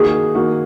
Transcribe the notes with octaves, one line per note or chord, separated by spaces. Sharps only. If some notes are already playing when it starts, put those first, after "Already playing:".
Already playing: D#3 A#3 D#4 F#4 G#4
D#3 A#3 D#4 F#4